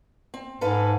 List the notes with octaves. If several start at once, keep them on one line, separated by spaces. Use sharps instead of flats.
C4
G#2 A4 B4 F5